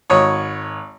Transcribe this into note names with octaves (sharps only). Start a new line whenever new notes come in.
G#1 C#5 D#6